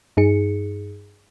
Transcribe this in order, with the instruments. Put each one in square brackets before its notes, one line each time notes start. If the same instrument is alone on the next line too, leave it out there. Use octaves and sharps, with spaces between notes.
[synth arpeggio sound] G2 D#4 G#4 C#7